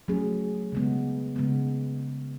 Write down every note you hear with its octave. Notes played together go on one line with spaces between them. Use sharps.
F#3 A3 C#4 G#4
C#3 G#3 B3
C#3 G#3 B3